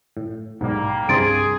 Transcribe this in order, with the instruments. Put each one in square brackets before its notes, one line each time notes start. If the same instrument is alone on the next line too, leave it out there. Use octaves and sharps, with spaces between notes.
[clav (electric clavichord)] A2
[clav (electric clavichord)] B1 G#2 [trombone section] G3 A#3
[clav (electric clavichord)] C2 G2 C3 [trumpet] G#4 [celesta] C6 A6 D7